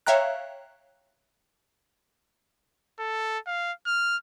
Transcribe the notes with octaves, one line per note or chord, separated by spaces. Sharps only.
C#5 E5 F5 G5 A#5 F#6
A4
F5
F6